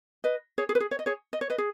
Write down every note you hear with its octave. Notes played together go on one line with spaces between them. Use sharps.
B4 D#5
G#4 C#5
G#4
B4
G#4
C#5
D#5
G#4 C#5
D#5
C#5
B4 D#5
G#4